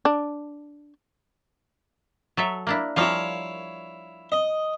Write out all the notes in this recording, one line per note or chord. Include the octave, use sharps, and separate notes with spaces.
D4
F#3 A4 E5
A#3 D4 E4
F3 G3 A#3 E4 C#5 F5
D#5